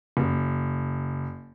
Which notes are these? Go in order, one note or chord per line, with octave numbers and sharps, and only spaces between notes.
F#1